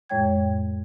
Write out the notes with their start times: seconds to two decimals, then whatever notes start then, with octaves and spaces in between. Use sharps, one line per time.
0.10 F2 A2 G#3 C#5 G5 G#6